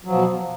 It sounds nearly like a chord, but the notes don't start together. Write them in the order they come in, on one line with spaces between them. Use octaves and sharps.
F#3 F3 B2